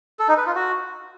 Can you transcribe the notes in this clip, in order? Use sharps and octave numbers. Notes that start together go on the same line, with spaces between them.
A4
D#4
B4
F4
F#4